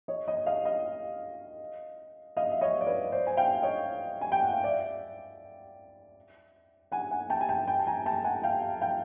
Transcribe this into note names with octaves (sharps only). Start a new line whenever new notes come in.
C#5 D#5
C#5 D#5
D#5 F5
D#5 F5
D#5 F5
E5
C#5 D#5
D5
B4 C#5
C5 D5
G#5
F5 G5
C#5 D#5
G#5
G5
F#5
F5
D5 E5
F#5 G#5
F#5 G#5
G5 A5
G#5
G5 A5
G#5
G5 A5
A5
G#5 A#5
G5 A5
F#5 G#5
F5 G5
F5 G5